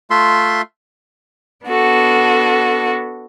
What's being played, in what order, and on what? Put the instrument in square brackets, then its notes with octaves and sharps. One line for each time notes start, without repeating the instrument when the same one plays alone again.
[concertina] A3 F4 E5 C6
[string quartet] B3 D4 F#4 A4